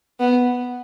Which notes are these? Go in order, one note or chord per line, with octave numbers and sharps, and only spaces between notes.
B3